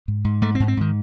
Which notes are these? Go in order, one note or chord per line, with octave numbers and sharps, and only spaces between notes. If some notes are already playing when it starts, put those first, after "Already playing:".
G#2
G#2
G#2 A3
C4
G#2
C4
G#2 D#3